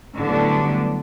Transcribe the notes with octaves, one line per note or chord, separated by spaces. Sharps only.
A2 D3 F#3 G3 B3 D4